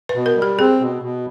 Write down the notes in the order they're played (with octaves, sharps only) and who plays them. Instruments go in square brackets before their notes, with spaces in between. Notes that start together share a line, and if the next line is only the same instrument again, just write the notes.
[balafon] B4
[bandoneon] B2
[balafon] A#4
[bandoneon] G3
[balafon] G4
[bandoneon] C4 [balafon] G#4
[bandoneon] B2
B2